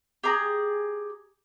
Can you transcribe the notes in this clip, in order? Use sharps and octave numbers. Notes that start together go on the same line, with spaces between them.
G4 G#4 A#5 D#6